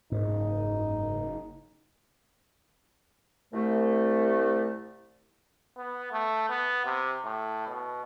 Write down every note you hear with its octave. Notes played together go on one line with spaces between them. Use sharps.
F#1 G#2 D#4
C2 A3
B3
A3
B3
C3
A2
B2